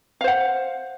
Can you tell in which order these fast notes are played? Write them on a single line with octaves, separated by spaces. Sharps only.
F5 C5 F#5